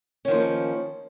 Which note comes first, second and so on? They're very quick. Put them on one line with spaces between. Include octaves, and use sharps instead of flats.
C#4 D#3 F3 A#3